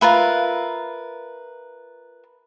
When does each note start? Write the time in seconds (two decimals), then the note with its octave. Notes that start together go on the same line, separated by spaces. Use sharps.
0.01 F4 A#4 B4 E5